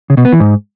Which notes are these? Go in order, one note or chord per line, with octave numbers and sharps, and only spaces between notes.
C#3
B2
B3
E3
G#2